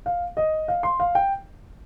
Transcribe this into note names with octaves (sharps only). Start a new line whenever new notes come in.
F5
D#5
F5
C6
F5
G5